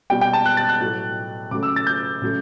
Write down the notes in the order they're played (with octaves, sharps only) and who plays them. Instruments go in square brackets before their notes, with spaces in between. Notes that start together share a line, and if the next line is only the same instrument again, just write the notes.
[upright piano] B2 G3 G5
G5
A5
F#6
A6
F#6
A2 F#3 A3
C#3 F#3 A3 D6
E6
A6
G6
C#3 F#3 A3